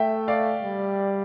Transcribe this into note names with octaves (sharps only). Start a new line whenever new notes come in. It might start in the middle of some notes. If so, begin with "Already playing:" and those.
Already playing: A3 E5 G5
D5 F5
G3